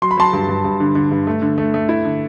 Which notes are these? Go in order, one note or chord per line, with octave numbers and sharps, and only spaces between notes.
F#3 C6
B5
F#3 A5 C6
G2
G2
G2
D3
D3
G2
A3
D3
A3
A3
E4
D3